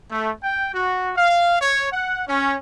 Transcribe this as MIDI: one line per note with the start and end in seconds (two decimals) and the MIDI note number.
0.10 0.32 57
0.43 0.69 79
0.74 1.10 66
1.16 1.55 77
1.61 1.87 73
1.91 2.22 78
2.28 2.55 61